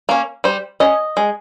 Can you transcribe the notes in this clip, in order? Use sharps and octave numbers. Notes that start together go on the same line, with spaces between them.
A#3 C#4
G3 C5
C#4 D#5
G#3